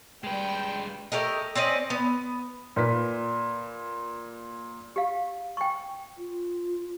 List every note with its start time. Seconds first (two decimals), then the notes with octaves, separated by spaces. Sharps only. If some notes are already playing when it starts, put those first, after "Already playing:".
0.24 G3 G#3 B4 G5
1.12 A3 G4 A#4 D#5
1.55 C4 C#4 D5 D#5
1.90 B3
2.76 A#2 B4 B6
4.96 G4 F5
5.57 G5 C#6
6.18 F4